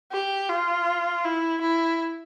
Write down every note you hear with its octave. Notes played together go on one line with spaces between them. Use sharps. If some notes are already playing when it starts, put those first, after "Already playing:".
G4
F4
E4
E4